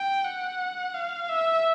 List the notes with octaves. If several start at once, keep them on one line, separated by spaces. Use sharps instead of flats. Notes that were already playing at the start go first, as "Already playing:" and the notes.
Already playing: G5
F#5
F5
E5